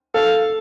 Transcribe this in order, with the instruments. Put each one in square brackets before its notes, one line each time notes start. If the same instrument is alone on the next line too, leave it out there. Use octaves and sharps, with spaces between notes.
[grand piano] A4 [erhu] F5